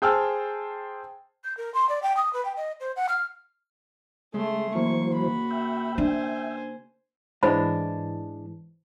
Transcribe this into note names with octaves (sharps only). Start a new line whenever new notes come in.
G#4 C5 G5 A5 E6 F6
G6
A#4
C6
D5
G5
D#6
B4
G5
D#5
C5
F#5
F6
C#3 G#3 A3 C6
E3 F#3 A#3 C5 C#6
F#4 B5
E5 G5
D4 C5 G#5
G#2 E3 G#3 D4 C5 B5